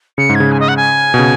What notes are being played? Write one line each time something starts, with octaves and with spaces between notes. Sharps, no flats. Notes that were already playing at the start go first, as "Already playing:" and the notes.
C#3 C#7
G#2
G#6
C#3
G#5
D#5
F#5
G#5
B2
C#3